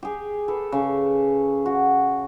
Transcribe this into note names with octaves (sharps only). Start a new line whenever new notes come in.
G4 G#4
A4 B4
C#3
F#4